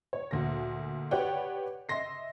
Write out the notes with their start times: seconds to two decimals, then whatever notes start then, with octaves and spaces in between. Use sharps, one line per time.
0.13 C#5
0.31 D2 A#2 A#6
1.11 G4 B4 C#5 D5 F#5 G5
1.89 D#5 E5 C6 A#6 C7